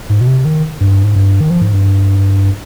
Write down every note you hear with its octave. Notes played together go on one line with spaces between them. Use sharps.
G#2
B2
C3
D#3
G2
G#2
G2
D#3
F3
G#2
G2